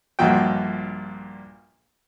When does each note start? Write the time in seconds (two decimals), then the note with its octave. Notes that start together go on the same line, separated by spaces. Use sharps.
0.19 A#1 G2 A#2 F3 F#4 G5